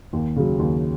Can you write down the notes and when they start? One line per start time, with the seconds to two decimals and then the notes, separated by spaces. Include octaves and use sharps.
0.13 D#2
0.36 C#3 F#3
0.59 D#2